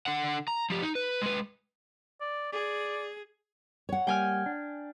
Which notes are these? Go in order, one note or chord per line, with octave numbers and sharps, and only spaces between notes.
D3 F#5
A#5
F3 G4
D#4
B4
G#3 B4
D5
G#4 D5
C#5 F#5
G3 A#3 G5 G#5 F6
D4